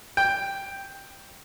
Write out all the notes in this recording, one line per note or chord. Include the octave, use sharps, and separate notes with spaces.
G5